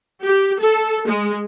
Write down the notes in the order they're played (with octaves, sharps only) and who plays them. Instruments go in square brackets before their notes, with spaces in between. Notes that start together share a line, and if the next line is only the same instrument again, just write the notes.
[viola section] G4
A4
G#3